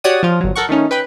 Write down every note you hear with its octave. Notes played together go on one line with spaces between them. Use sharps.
F#4 G4 C#5 D5 F#5 D#6
F3 F4
G1 F#3
A4 A#4 F#5 C#6
D#3 A3 C#4 D#4
B4 G5 B5